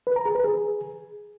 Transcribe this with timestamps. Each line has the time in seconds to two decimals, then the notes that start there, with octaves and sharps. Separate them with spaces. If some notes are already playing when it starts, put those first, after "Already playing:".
0.07 B4
0.16 A#5
0.26 G#4
0.35 B4
0.44 G#4